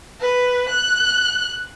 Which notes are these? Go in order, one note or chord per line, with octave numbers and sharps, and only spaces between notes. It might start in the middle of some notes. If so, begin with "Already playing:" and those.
B4
F#6